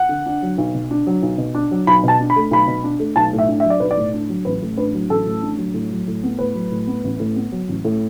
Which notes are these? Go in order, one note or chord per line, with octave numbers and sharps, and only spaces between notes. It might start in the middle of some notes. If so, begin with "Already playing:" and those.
Already playing: F#5
D3
D4
F#3
B1
B2
D4
F#3
B1
B2
D4
F#3
B1 B5
B2 A5
D4
B5
A3
B1 B5
B2
D4
A3
B1 A5
A2
E5
D4
F#3 E5
D5
B1 B4
D5
A2
D4
F#3
A1 B4
A2
D4 B4
F#3
A1 A4
A2
D4
F#3
A2
F#3
A2
B3
A2 B4
F#3
A2
B3
A1
A2
B3
F#3
A1
A2